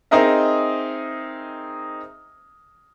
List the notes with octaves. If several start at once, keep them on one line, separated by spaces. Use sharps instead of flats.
C4 D#4 G#4 A#4 D#5 E5